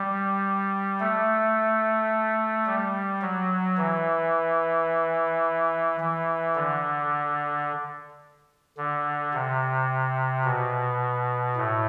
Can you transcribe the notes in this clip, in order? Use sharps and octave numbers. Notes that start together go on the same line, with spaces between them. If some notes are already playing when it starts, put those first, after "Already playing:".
Already playing: G3
A3
G3
F#3
E3
E3
D3
D3
C3
B2
A2